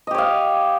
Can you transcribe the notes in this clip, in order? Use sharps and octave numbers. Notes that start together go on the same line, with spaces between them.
G4 C#5 D#5 F5